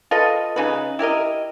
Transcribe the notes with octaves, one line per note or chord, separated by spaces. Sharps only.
F4 A4 B4 D#5
C#3 D#4 B4
E4 G4 A#4 D#5